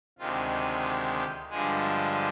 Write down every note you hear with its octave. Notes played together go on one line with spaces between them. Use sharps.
D2 C3 D#3 G#3 F4
D#4
F4
G4
G2 D3 F3 G#3 G#4